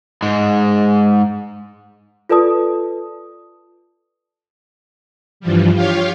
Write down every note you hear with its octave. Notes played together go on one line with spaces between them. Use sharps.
G#2 G#3
F4 A4 B4 D5 A5 D#6
G2 E3 F3 G3
F4 G4 C#5 F5